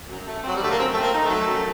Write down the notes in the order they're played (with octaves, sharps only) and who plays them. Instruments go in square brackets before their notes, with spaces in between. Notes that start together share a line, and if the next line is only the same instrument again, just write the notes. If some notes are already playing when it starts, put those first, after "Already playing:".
[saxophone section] F#2
A3
[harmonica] F#3 [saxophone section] C4
[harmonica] G3
[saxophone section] D3 [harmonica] A3
[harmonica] A#3
[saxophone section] F#2 [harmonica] C4
[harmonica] A3 [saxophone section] C4
[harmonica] A#3
[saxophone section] D#4
[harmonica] A3
[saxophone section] F#3
F#2